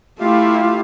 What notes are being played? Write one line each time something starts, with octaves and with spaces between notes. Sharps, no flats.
A3 E4 F4 G4 F5